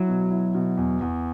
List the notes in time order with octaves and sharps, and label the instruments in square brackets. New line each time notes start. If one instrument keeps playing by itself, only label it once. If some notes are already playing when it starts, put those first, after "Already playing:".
Already playing: [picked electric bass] F#3 [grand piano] E4
[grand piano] B2
E4
B2
E2
E2